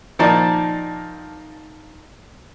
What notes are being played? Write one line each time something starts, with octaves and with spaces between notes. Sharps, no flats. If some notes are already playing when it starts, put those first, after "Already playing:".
A#2 D#3 F3 D#4 D5 A5